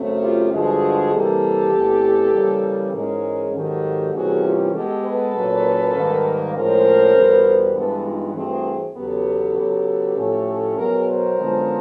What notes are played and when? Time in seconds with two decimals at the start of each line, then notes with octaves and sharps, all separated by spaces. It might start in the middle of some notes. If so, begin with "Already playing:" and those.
Already playing: F#2 C#3 F#3 A3 C4
0.21 F4 G4
0.51 G2 D3 F3 G#3 F#4 G#4
1.11 C3 E3 G3 A#3 G4 A4
1.72 E2 C3 E3 A3
2.32 C#3 E3 G3 A#3
2.92 G#2 E3 G#3 C#4 G#4 A#4
3.53 G#2 D#3 F#3 G4 A4
4.13 C3 E3 G3 A#3 C#4 F#4 G#4
4.43 F4 G4
4.73 B2 G#3 B3 G4 A4
5.03 A4 B4
5.34 A#2 F#3 A#3 C#4
5.94 G#2 D#3 G3 A#3
6.54 A2 F3 G#3 C#4 A#4 C5
7.15 E2 B2 G3 B3
7.75 G2 E3 G#3 B3 A4 B4
8.05 D#4 F4
8.35 G2 E3 A3 C4 F#4 G#4
8.95 E2 C#3 F#3 B3 G4 A4
9.56 C#3 F#3 B3
10.16 A2 F3 A3 C#4
10.76 B2 F#3 B3 G#4 A#4
11.07 A#4 C5
11.37 F#2 D3 F3 G#3 B3